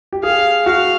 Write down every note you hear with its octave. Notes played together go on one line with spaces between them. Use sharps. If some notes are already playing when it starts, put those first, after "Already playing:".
G4
G#4 F5
F#4 F5